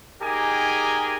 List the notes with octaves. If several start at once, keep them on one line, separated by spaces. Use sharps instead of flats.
D#4 G4 G#4 A#4 G5 G#5